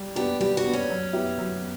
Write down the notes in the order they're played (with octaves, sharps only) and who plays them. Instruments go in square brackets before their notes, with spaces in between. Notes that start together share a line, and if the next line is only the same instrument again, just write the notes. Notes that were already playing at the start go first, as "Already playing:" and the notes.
Already playing: [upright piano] G3
[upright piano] B3 D4 [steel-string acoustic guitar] G4
[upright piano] G3 [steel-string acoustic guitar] G4
[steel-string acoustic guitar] F#4
[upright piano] B3 D4
[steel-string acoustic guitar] C#4
[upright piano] F#3
B3 E4 G4
F#3